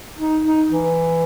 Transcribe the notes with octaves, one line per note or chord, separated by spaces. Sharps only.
D#4
D#4
E3